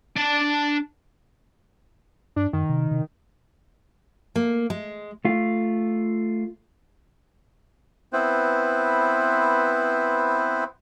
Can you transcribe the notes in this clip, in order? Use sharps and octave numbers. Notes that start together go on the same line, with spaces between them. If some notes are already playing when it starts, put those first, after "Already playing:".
D4 A5
G2 D4
F#2 D#3
C3
C3
A#3
G#3
A3 F4
B3 C4 E4 B4 C5